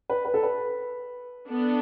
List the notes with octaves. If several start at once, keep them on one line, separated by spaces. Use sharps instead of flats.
B4
B4
A4
B4
B3 D4 A4